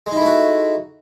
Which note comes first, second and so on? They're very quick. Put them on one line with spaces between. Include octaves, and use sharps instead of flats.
G#3 D#4 E4 A3 F#4